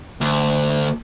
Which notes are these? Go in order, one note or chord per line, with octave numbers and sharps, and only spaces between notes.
D2